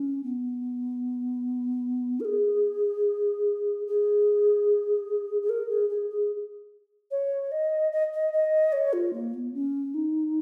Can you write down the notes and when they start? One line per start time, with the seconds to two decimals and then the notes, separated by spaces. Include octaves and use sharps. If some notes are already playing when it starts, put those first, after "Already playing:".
Already playing: C#4
0.24 B3
2.20 A#4
2.25 G#4
3.87 G#4
5.42 G#4
5.49 A#4
5.69 G#4
5.89 G#4
6.10 G#4
7.11 C#5
7.52 D#5
7.92 D#5
8.14 D#5
8.33 D#5
8.73 C#5
8.93 F4
9.13 A#3
9.34 B3
9.54 C#4
9.94 D#4